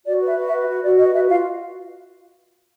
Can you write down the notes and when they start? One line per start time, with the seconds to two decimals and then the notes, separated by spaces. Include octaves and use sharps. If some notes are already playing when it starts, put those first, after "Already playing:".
0.05 F#4 D5
0.21 B4
0.27 E5
0.37 F#4
0.47 E5
0.52 B4
0.68 F#4
0.83 F#4 D5
0.99 B4 D#5
1.14 F#4 E5
1.29 F4 F5